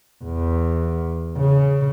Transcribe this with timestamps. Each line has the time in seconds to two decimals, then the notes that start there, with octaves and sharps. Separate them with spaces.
0.24 E2
1.37 C#3